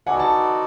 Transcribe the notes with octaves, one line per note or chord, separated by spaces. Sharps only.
B3 D#4 F#4 A4 D5 F#5 G#5
A5